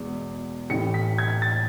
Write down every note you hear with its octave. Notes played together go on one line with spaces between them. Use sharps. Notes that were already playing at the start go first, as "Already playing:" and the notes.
Already playing: E2 B2 G#3
A1 A2 E3 C#7
B6
G#6
A6